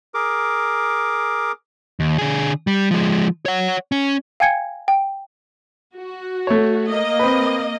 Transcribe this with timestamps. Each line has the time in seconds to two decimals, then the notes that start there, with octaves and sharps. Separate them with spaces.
0.14 G#4 A#4 D6
2.00 D#2
2.18 D3 G#4
2.67 G3
2.91 F3 G#3
3.46 C#5 F#5
3.92 C#4
4.40 F5 G5 G#5 G#6 C#7
4.88 G5
5.96 F#4
6.47 A3 C#5
6.88 A#3 D#5
7.19 C4 B4